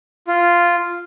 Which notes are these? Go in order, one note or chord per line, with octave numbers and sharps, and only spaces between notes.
F4